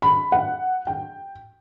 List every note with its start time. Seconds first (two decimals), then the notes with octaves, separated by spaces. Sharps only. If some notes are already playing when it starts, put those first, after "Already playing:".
0.02 B5
0.32 F#5
0.87 G5